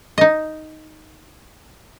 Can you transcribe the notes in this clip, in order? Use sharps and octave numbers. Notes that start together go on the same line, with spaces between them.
D#4 D#5